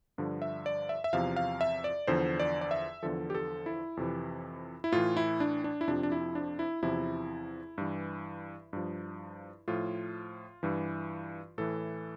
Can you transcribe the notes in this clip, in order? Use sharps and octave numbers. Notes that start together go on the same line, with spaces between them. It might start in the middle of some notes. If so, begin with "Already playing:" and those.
G2 D3 F3
E5
D5
E5
E5
E2 C3 F3 F5
F5
E5
D5
E2 D3 F3 C5
D5
D5
E5
E2 D3 F3 A4
G4
A4
E4
F2 C3 E3
E4
A2 E3 F4
E4
D4
D4
E4
F2 C3 F3 D4
D4
E4
D4
E4
E2 C3 F3 E4
G2 E3
G2 F3
A2 F3 F4
G2 E3
A2 E3 A4